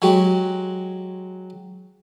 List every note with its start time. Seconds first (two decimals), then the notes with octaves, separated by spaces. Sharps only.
0.02 F#3 G#3 F#4 G4